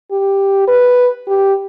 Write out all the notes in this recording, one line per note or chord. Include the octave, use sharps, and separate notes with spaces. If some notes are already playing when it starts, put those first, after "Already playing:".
G4
B4
G4